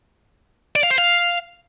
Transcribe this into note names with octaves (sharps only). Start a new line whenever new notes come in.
D5
F5
C5
F5